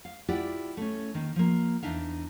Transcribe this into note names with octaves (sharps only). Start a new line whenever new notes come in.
F5
E4 F4 G4 D5 F#5
A3 C#4
D#3 A#3
F3 A#3
E2 E3 D4 D#4 E5 F5